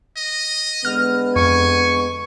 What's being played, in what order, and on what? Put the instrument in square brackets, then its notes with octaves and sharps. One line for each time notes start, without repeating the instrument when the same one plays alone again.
[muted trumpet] D#5
[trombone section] D3 G#3 B3 [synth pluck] F6
[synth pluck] F2 [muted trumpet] G#5 [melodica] C#6